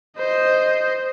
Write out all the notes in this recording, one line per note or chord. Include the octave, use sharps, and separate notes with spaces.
C5 D#5